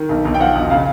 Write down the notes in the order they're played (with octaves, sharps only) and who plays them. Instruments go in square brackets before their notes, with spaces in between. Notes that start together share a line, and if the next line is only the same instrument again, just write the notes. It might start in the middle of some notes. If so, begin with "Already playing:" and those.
Already playing: [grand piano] D#3
B1
B1
G5
F3 F#5
E1
C#3 F5